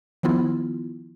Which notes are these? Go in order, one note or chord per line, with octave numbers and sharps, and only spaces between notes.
D#3 F3 B3 E4 F4